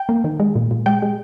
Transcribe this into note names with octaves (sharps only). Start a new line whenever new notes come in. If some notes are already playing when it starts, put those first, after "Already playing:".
Already playing: G5
A#3
D#3
G#3
A#2
A#2
G#3 G5
G#3